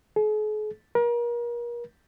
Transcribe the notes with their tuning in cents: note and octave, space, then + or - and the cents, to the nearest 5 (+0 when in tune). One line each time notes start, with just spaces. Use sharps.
G#4 +45
A#4 +35